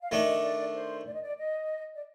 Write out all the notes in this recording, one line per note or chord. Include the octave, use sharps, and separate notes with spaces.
F5
D#3 A3 D4 D#5
D5
C5
D5
D#5
D5
D#5
D5